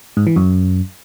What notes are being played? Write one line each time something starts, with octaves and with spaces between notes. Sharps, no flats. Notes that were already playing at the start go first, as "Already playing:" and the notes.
G#2
E3
F#2